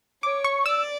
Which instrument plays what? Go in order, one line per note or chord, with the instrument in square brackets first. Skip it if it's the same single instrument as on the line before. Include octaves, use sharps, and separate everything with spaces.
[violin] C#5 [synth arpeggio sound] D6
[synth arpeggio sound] C#6
[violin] D5 [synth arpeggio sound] E6